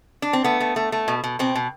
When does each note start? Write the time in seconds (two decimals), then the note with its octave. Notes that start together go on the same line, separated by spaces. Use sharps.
0.22 D4
0.33 C4
0.44 A3 B3
0.60 A3
0.76 A3
0.92 A3
1.08 B2
1.24 B2
1.39 B2 C4
1.55 B2